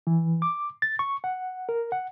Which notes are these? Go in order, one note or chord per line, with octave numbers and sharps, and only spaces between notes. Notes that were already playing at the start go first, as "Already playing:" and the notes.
E3
D6
A6
C#6
F#5
A#4
F#5